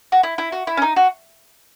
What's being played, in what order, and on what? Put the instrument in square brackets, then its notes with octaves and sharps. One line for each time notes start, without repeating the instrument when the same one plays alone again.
[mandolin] F#4
E4
E4
F#4
E4
C#4
D#4
F#4